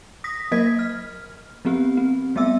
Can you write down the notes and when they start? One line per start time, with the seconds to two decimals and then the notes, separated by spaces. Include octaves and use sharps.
0.24 D#6 A#6 B6
0.52 F#3 A#3 A#4 D#5 G#6 B6
0.79 F6
1.65 F3 B3 C4 G4
1.97 C4
2.36 G3 A3 B3 E5 E6